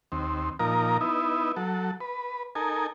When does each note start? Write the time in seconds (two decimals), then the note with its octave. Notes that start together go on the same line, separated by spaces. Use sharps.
0.12 D#2 C4
0.59 A#2 F3 D#4 A#4 A#5
1.01 B3 D#4 E4
1.56 F#3 A4
2.00 B4
2.55 D#4 A4 A#4 G#5